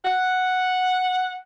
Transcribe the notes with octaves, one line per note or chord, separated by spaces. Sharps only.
F#5